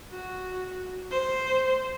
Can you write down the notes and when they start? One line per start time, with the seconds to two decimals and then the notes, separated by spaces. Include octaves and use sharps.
0.10 F#4
1.11 C5